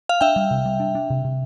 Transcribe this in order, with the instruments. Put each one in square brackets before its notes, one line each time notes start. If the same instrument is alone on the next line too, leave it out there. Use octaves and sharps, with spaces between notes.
[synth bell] F5
[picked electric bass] D4 [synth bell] E5 G5
[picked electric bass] G3
C3
G3
D4
D4
C3
C3